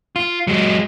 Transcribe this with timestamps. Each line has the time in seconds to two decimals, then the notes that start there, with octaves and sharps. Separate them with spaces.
0.16 F4
0.47 F#3 G#3